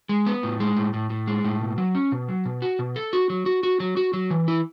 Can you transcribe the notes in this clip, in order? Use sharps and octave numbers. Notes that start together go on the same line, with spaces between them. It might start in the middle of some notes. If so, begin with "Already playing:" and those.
G#3
B3
A2
G#3
A2
A2
A2
G#3
A2
B2
F#3
C#4
B2
F#3
B2
F#4
B2
A4
F#4
F#3
F#4
F#4
F#3
F#4
F#3
E3
E4